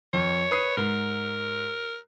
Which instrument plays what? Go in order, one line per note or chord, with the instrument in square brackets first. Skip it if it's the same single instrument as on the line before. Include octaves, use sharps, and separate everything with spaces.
[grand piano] F2 [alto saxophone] C#5
[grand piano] B4 D#6 C7
[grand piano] G#2 [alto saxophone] A#4